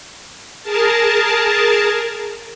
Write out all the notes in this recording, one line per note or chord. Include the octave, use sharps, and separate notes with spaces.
G#4 A#4 A5